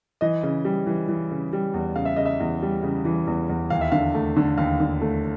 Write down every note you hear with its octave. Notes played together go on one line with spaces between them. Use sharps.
E3 D#5
C#3
G3
E3
E3
C#3
G3
E2
C#3 F5
E5
C#3 D#5
E5
E2
G3
C#3
E3
E2
E2
D#2 F5
E5
D3 F5
A3
D3
D#2 F5
D3
A3